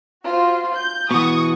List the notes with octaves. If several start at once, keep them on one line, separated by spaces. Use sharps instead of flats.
F4 F#4 C5
G6
B2 E3 F#4 C#6 D#6